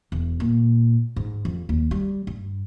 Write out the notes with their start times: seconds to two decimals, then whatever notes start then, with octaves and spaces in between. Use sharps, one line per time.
0.12 E1
0.40 A#2
1.16 G#2
1.45 F2
1.69 D#2
1.91 G3
2.27 G2